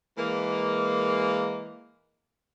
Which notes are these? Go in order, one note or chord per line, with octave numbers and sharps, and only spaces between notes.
E3 G#3 A#3